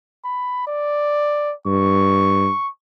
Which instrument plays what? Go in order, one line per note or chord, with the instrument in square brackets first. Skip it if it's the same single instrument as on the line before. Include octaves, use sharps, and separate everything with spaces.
[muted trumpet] B5
D5
[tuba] G2 [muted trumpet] C#6